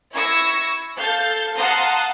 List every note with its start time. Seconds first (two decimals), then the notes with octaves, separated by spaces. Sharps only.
0.13 E4 C#6 E6 G#6 A#6 C#7
0.97 A4 F5 G6 A6
1.57 F5 F#5 A5 A#5 C6 D#6